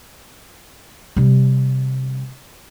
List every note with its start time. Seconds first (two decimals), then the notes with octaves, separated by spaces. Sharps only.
1.16 C3 G3